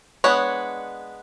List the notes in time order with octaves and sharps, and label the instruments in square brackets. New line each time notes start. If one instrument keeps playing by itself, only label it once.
[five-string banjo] G#3 B3 D4 C#5